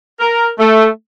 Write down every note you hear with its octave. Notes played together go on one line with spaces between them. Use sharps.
A#4
A3